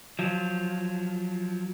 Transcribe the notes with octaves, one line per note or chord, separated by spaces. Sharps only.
F3 F#3